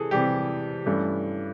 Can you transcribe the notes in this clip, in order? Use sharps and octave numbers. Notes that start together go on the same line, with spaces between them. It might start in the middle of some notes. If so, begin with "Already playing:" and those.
Already playing: C3 E3 G#4 A4
C3 E3 G3 G4
G2 E3 A3 C#4